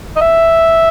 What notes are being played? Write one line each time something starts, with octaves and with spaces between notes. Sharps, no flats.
D#5
E5